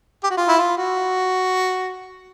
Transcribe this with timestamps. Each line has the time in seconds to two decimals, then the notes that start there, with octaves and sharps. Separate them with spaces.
0.23 G4
0.30 F#4
0.37 F4
0.48 E4
0.58 F4
0.78 F#4